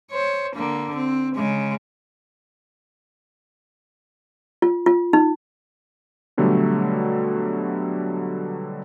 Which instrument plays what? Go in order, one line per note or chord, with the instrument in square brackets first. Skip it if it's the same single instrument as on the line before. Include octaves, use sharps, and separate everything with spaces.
[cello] C5 C#5
D3 A#3
C4
C#3 G#3
[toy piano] F4
F4
D#4
[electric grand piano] B2 D3 F#3 G3 A3